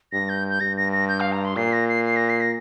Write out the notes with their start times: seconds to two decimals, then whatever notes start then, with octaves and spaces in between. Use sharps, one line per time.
0.12 G2 A#6
0.29 G6
0.50 G6
0.60 G2 A#6
0.77 A#6
0.93 A#6
1.08 G6
1.20 F5
1.32 A#5
1.45 C6
1.56 A#2 C7
1.73 A#6
1.89 C7
2.05 C7
2.16 A#6
2.29 C7
2.41 A#6